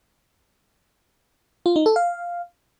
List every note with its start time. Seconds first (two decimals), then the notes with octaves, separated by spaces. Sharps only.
1.66 F4
1.76 D#4
1.86 A4
1.96 F5